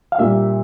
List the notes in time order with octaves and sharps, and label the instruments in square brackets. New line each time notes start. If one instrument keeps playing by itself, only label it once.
[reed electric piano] F5
[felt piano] A#2 G3 A#3 D4 G4 [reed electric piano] E5